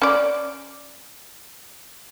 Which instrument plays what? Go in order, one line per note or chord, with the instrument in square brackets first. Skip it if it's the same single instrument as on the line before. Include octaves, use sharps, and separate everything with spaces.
[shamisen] C#4 D5